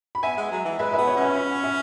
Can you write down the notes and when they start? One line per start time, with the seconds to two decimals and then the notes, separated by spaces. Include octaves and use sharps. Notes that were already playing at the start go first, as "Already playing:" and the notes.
0.15 B5
0.23 B3 E5 G#5
0.37 G#3
0.52 F#3
0.65 E3
0.79 G#3 B4 E5
0.93 B4 E5
0.98 B3 G#5
1.07 C#5 F#5
1.17 C#4 E5 G#5
1.35 F#5 B5
1.64 E5 G#5